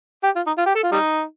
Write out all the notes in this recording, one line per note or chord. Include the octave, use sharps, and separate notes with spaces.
G4
F4
D#4
F4
G4
A4
F4
G3 D#4